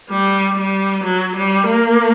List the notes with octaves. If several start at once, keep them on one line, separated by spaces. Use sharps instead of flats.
G3
G3
F#3
G3
A#3